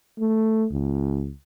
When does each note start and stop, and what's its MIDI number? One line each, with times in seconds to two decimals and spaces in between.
0.19 0.66 57
0.72 1.32 37